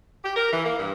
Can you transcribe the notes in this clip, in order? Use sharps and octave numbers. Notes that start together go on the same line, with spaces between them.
G4
A#4
E3
A#3
G2